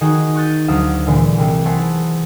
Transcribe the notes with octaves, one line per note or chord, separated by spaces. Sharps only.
D#3 D#4 F#4 G#4
C#6 F#6 G6 A6 D#7
D2 F#3 F5 D#6 E7
A#2 D3 E3 G#3
C2
E4 G#4 C5 F#5 A5 C#6